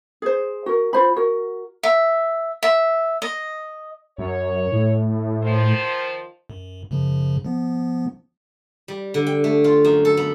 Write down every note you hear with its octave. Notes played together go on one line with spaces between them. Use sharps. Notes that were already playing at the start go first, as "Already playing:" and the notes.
G#4 C5
F#4 A#4
F4 C5 B5
F#4 A#4
E5
E5
D#5
F#2 C#5
A2
D#3 F3 C5
F#2
F#2 C#3 F3
F3 B3
G3
D3
G5
A3
F4
F#2
A4
B3